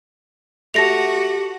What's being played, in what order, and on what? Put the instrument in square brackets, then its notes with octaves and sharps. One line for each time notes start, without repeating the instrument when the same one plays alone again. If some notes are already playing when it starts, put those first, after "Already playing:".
[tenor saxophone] A3 [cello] F#4 [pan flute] G4 [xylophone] A5 A#6 F7